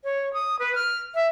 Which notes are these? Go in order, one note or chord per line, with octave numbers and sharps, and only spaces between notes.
C#5
D#6
B4
F6
E5